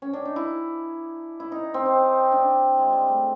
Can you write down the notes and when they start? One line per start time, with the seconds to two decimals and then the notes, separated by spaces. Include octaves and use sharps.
0.02 C#4
0.13 D4
0.25 D#4
0.36 E4
1.40 E4
1.52 D#4
1.74 C4
1.86 D#4
2.32 D4
2.78 G#3
2.93 G3
3.08 A3